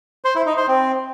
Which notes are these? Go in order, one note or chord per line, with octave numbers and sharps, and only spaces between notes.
C5
E4
D#4
C5
C4